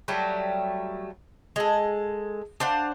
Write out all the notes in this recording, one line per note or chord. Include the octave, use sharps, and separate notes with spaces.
F#3 G3 A3
G#3 A4
D4 C5 F5 F#5